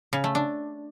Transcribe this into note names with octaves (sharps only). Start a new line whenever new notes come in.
C#3
A3
D4